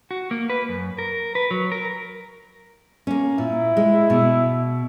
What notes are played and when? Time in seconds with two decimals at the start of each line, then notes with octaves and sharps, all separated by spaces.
0.11 F#4
0.31 A#3
0.50 B4
0.69 F#2
0.99 A#4
1.35 B4
1.51 F#3
1.72 A#4
3.07 A#3 C#4
3.38 A#2 E4
3.77 G#3
4.10 B2